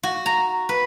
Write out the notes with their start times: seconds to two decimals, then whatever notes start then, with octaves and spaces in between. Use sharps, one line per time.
0.03 F#4
0.26 A#5
0.69 B4